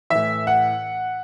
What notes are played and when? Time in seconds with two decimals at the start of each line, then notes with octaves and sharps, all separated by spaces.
0.10 A2 E3 E5
0.47 F#5